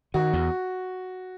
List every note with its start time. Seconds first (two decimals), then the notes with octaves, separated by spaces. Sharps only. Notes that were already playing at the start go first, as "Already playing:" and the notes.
0.14 D#3 F#4
0.33 E2